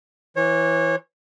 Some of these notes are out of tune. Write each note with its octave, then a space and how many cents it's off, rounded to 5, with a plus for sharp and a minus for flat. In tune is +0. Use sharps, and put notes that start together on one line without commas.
E3 +0 C#5 -30